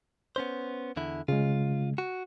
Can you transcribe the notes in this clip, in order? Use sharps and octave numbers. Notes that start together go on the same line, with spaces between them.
B3 C#4 C5
E2 D3 E4
C#3 G#3 F4
F#4